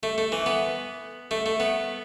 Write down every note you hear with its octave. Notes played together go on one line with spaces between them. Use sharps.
A3
A3
E3
B3
A3
A3
B3